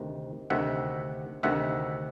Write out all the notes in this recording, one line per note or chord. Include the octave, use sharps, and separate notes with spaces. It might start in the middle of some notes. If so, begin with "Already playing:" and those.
Already playing: D2 C3 D#3
D2 C3 D#3 E5 F#5
D2 C3 D#3 E5 F#5